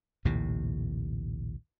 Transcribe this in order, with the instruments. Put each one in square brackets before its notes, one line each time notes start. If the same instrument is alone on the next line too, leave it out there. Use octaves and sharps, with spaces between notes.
[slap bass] A#1 D#2 A2 C3